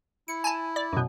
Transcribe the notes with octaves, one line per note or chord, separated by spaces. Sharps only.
E4 C#7
G#5 A5
D5
F#2 B2